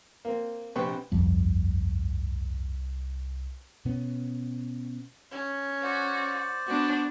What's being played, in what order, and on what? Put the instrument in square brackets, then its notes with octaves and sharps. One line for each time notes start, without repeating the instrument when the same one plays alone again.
[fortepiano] A#3 C4
A#1 C3 B4 C5 G5 C#6
[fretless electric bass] G1 F2 [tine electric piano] C2
[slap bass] B2 B3 C#4
[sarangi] C#4
[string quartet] F#4 [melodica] C5 D5
[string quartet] B3 D4 [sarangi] F#4